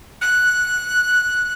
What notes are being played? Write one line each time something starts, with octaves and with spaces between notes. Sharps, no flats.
F#6